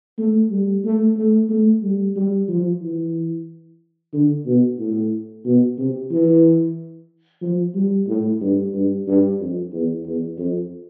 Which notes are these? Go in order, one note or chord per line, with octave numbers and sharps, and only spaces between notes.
A3
G3
A3
A3
A3
G3
G3
F3
E3
D3
B2
A2
B2
C3
E3
F3
G3
A2
G2
G2
G2
F2
E2
E2
F2